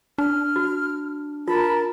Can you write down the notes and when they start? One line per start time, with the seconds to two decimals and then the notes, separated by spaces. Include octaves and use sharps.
0.18 D4 F6
0.56 F#4
1.48 F4 A#4 A5 B5